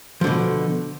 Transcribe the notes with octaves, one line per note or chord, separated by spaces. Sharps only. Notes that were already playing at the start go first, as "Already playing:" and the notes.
B2 D3 F3